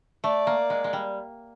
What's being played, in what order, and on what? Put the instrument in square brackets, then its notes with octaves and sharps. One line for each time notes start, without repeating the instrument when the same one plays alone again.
[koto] A3 [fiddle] D5
[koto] A#3
G#3
G#3
G3